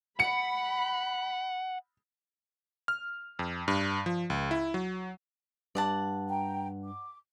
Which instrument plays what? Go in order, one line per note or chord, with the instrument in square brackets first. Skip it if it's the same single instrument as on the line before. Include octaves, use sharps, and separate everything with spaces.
[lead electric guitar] F#5 [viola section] B5 [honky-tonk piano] C#7
[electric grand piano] F6
F2
G2
F3
C#2
E4
F#3
[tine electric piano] G2 [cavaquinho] D5 F#5 A5
[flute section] G5 A#5
D6